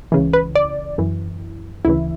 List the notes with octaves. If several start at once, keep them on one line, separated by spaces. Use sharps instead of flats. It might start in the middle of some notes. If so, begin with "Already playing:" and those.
C#2 C#3 E3
B4
D5
F#2 E3
D2 C#3 E3 E4